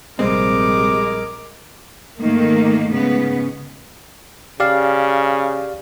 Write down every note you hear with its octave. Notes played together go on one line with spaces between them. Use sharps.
A#1 C3 G3 G#3 C4 A#4 D6
G#2 D#3 A3 A#3
G#2 C#3 B3
C#3 G4 D5 F5